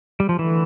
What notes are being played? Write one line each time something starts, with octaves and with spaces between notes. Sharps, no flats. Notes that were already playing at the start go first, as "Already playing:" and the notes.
G3
F3
D3 E3 A3 E4